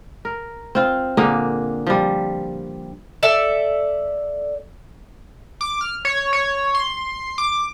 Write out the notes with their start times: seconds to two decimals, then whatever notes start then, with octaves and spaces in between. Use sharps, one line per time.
0.25 A#4
0.75 C4 F4
1.17 A#2 D3 A#3 G#4
1.87 F3 G3
3.23 A4 D5 E5
5.61 D6
5.81 F6
6.05 C#5
6.33 C#5
6.75 C6
7.38 D6